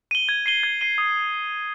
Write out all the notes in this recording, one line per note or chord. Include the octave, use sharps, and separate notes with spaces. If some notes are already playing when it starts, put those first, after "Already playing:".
D#7 G7
G#6
C7 D#7 G7
G#6
C7 D#7 G7
D#6